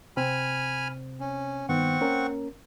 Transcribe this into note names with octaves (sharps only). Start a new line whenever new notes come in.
C3 C4 G#5 B5 F6
C#4
G2 D#3 B3 C4 F#5 C#6
A#3 C#4 A#4